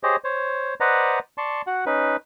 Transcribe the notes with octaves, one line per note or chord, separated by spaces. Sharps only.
G4 G#4 C5 C#5 D#5
C5 C#5
B4 C5 D5 D#5 F#5 A#5
D5 A5 C6 C#6
F#4 F#5
C#4 D#4 B4